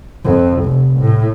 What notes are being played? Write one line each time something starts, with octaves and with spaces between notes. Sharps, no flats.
F2
F1
A2